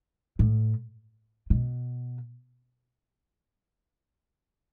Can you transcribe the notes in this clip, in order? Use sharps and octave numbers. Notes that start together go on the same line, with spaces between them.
A2
B2